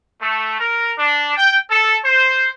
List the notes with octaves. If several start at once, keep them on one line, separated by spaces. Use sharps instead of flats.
A3
A#4
D4
G5
A4
C5